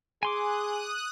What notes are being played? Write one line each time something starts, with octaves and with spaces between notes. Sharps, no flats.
G#4 G#5 C6 D6 D#6 F#6